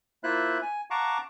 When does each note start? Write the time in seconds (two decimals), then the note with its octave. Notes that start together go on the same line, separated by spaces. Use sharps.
0.24 A#3 E4 F4 C5 E5 F#6
0.62 G#5
0.90 F5 F#5 A5 A#5 C#6 D6